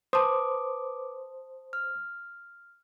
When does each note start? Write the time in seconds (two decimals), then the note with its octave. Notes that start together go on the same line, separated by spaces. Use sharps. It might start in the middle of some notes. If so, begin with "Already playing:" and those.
0.13 B4 C5 A5 D6 D#6
1.73 F6